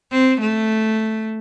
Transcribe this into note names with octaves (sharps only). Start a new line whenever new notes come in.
C4
A3